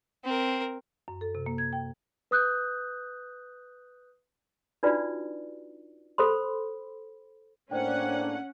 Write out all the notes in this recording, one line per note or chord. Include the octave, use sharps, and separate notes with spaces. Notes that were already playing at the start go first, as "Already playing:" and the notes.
C4 A#4
F#2
A4
C3
A#3
G#6
G5
B4 D#6 F#6 G6
D4 D#4 F4 F#4 B4 D5
A4 C5 B5 C6
A2 A#3 C#4 D4 C5 D5 F#5 G5